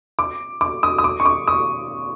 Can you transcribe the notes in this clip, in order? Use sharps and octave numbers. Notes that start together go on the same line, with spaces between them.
D6
D6
D#6
D#6
D6
C#6
D6
D#6